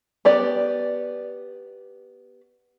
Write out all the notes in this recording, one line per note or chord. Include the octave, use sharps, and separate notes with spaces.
B3 G4 D5